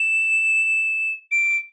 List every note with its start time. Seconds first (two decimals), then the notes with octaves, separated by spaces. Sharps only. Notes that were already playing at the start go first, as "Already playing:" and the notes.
Already playing: E7
1.32 D7